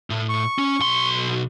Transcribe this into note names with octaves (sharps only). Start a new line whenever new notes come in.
A2
C#6
C#4
B1 C6